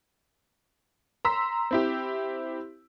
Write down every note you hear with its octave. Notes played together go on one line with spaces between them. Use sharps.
A#5 C6 E6 B6
C4 E4 G4